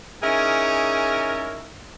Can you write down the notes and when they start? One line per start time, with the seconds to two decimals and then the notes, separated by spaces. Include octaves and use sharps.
0.23 C#4 D#4 E4 G#4 A#4 C#5